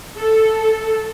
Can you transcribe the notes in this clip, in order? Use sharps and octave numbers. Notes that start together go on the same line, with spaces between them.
A4